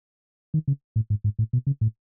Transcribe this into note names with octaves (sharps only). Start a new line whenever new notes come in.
D#3
C#3
A2
G#2
G#2
A2
B2
C#3
A2